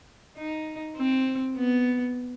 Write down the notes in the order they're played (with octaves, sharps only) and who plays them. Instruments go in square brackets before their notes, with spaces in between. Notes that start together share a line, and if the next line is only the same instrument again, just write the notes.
[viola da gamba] D#4
C4
B3